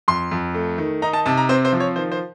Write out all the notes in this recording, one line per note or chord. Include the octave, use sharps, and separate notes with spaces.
F2 C6
F2
A3
D#3
D#4 A#5
A5
C3 A5
A#5
C4 C5
C5
F3
C#5
D#3 C5
C5